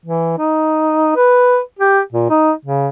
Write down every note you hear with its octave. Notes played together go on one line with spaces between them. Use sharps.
E3
D#4
B4
G4
A#2
D#4
C#3